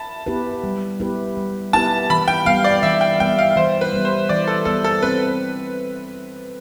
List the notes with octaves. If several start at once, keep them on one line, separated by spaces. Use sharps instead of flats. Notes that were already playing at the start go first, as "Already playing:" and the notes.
Already playing: A5 B5
B3 E4 G4 B4
G3
B3 E4 G4 B4
G3
B3 E4 G4 B4 A5
E3 B5
G5
G3 B3 F5
D5
E3 E5
G5
G3 B3 G5
F5
E3 C5
B4
G3 B3
C5
E3 D5
A4
G3 B3 A4
A4
C4 B4